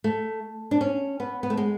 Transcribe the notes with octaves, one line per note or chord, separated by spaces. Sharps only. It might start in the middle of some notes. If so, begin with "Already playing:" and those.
A3
D4
C#4
B3
B3
A3
G#3